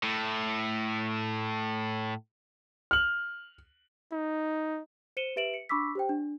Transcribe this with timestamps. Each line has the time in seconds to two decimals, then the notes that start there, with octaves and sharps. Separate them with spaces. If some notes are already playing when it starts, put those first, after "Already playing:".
0.03 A2 A3
2.91 F6 F#7
4.12 D#4
5.17 C5 C#7 D#7 E7 G7
5.36 G4 B4 E5 D7 E7 F#7
5.54 C#7
5.69 D4 B5 C#6 D6 E6 B6
5.95 G4 C5 G5
6.09 D4